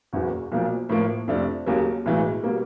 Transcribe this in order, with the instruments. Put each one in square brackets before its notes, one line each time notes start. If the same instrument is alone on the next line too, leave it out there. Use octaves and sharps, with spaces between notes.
[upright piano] F#1 E2 B2
B1 A#2 F3 A#3
A2 F3 A#3
F2 C3 F3 A3 D4
D#2 C#3 F#3 A#3
B1 A2 E3 G#3
B2 G3 A#3